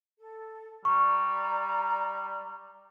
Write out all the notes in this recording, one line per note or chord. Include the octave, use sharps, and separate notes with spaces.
A4
G3 D5 A#5 C#6